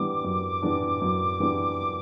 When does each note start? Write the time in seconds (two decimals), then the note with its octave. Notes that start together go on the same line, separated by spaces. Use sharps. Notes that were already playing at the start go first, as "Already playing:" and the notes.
Already playing: E3 G3 B3 D4 D6
0.24 F#2
0.62 E3 G3 B3 D4
1.02 F#2
1.40 E3 G3 B3 D4